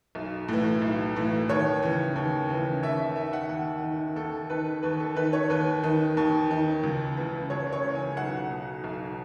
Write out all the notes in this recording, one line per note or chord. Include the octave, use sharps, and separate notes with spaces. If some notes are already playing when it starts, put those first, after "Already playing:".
B1
A2 E3
B1
A2 E3
D#2 C#5
C#3 E3
D#2
C#3 E3
D#2 E5
E5
D#3 E5
F#5
D#2 F#5
D#3
D#2 A4
D#3 B4
D#2 B4
A4
D#3 B4
C#5
D#2 B4
D#3
D#2
D#3
C#2
C#3 E3
C#2 C#5
C#5
C#3 E3
G#5
B1 F#5
B2
B1